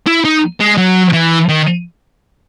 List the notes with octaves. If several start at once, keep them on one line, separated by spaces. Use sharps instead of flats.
E4
D#4
G#3
F#3
E3
D#3